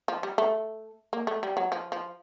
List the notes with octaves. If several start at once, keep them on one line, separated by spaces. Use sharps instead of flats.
F3
G3
A3
A#3
A3
G3
F#3
F3
F3